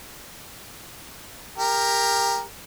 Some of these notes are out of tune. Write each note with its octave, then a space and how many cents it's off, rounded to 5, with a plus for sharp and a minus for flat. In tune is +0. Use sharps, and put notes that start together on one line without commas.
G4 +25 A#4 +0